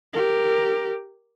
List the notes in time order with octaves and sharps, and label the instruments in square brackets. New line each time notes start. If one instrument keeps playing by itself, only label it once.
[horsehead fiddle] G4 A#4